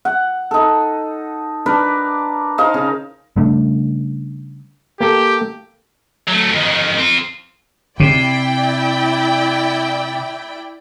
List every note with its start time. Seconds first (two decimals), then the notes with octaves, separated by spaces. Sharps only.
0.05 F#5
0.51 D#4 A4
1.66 D4 A#4 B4 D5
2.58 D#4 A#4 C5 F5
2.74 C#3
3.36 C#3 G3 A3 D4
5.00 A#3 G4 A4
6.28 F#3 A3
6.51 F2 D#3
6.98 C4 F4
8.00 C3 E4 D5 G5